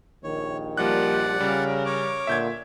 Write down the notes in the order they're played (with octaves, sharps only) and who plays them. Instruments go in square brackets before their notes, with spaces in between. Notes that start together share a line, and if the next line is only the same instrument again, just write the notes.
[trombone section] A#1 D#2 D#3 [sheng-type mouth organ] C#5
[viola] F3 G3 [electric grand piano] A#3 F#6 [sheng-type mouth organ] D5 F#5
[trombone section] C#3 [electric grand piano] G3 [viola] A#4
[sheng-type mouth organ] C#5 D6
[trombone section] A#2 D3 [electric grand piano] E5 G6 G#6